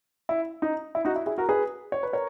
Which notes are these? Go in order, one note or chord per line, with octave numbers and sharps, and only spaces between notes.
E4
D#4
E4
D#4 F#4
E4
E4 G#4
F#4 A#4
G#4 B4
C#5
B4
A#4 C#5